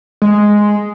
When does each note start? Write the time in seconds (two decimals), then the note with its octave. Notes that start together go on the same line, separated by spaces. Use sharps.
0.22 G#3